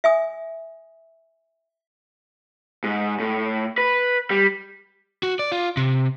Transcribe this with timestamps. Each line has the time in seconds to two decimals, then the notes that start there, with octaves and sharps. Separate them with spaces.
0.04 E5 G#5 D#6
2.84 G#2
3.20 A2
3.78 B4
4.30 G3
5.23 F#4
5.39 D5
5.52 F4
5.77 C3